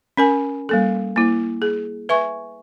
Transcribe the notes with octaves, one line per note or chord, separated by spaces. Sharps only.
C#4 A#4 G#5
G3 A#3 A4
A#3 E4
G#4
B4 E5 G#5 C#6